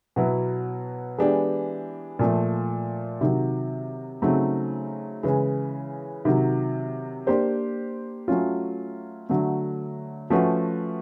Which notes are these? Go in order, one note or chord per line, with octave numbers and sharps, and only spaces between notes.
B2 F#3 B3 E4
E3 G#3 B3 D4 G4
A#2 F3 A3
C3 D#3 F#3
C#3 F#3 A3 C4 D#4
C#3 E3 G#3
C3 D#3 F#3
A#3 D4 G4 C5
F#3 A3 C#4 F4
D3 F#3 A3
F3 A3 C#4 F#4 B4